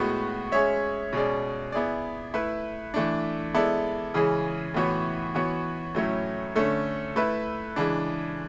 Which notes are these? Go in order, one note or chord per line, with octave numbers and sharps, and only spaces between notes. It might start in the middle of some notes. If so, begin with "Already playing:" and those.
Already playing: A2 G#3 B3 F#4
G#3 C#4 G#4 C#5 E5
B2 G#3 C#4 G#4 D5
B3 E4 G#4 D5
A3 E4 B4
E3 A3 D4
G#3 B3 E4 A4 D5
C#3 E3 G#3 C#4 G#4
A2 E3 B3 F#4 C#5
E3 B3 F#4 C#5
A2 F#3 A3 C#4 E4
D3 A3 C#4
A3 E4 B4 E5
C#3 E3 G#3 D4